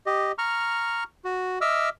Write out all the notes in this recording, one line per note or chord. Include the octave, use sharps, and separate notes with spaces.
G4 D#5
A#5 C#6 F6
F#4
D#5 E5 D6 E6 F6